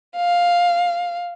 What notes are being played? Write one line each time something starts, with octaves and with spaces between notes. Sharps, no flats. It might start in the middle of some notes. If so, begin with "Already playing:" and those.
F5